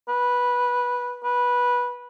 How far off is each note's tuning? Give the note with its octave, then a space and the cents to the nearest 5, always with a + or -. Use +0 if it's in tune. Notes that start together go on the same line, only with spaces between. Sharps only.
B4 -10
B4 -15